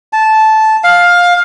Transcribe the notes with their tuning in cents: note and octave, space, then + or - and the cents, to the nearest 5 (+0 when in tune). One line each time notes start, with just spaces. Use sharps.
A5 -10
F5 +15